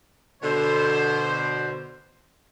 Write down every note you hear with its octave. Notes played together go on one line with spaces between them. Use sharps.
B2 D3 C5